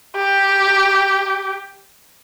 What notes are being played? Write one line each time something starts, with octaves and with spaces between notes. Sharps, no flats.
G4